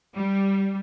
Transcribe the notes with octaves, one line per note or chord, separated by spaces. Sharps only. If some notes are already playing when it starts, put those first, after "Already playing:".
G3